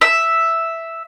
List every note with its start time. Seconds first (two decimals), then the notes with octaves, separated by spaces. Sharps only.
0.01 E5